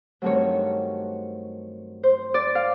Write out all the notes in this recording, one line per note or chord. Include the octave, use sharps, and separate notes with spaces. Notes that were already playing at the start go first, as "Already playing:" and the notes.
G2 D#3 F#3 A3 C4 C#5
C5
D5
F5